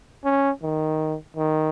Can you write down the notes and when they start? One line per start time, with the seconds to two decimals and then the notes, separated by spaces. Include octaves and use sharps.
0.24 C#4
0.63 D#3
1.36 D#3